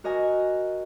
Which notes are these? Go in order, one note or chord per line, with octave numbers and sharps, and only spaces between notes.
F#4 A#4 D#5 G#5